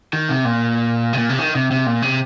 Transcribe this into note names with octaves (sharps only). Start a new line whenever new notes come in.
D#3
C3
A#2
C3
A#2
C3
D#3
C3
C3
A#2
C3